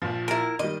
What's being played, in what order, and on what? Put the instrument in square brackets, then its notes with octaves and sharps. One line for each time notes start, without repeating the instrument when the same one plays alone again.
[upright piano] A#1 F3
[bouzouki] E4 A#4
[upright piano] D#3 G3 [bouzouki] D#5